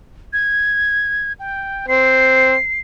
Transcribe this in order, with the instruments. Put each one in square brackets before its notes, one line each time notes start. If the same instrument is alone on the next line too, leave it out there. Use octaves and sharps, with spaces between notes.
[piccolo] G#6
G5
[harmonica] C4 [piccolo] C7